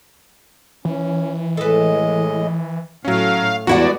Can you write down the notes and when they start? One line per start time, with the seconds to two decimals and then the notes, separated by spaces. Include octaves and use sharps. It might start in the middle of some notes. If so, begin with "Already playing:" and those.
0.85 E3 C#4
1.57 A2 G#3 A4 B4 D#5
3.05 A2 F#3 A3 C#4 F5
3.67 E2 G3 G#3 B3 E4 F#4 D5 F#5